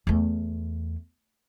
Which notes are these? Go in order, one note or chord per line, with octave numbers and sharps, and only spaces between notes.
E2 A3